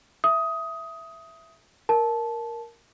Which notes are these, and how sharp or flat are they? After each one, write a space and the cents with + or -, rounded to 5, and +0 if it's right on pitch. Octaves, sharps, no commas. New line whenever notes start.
E5 +10 D#6 +15
A#4 +0 A5 -15